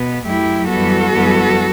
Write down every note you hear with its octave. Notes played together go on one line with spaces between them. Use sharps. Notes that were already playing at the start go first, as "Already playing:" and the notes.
Already playing: B2 B3
F#2 F#3 A3 E4 G4
F#2 E3 G3 B3 F#4 A4
F#2 E3 G3 B3